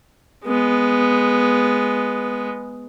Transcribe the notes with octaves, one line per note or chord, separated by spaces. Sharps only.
G#3 B3